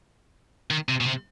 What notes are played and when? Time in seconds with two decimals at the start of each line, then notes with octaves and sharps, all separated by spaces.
0.71 D#3
0.89 C3
1.01 B2
1.06 C3